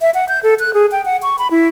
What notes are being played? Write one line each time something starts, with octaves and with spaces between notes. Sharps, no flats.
E5
F#5
G6
A4
F#6
G#4
G5
F#5
C#6
B5
E4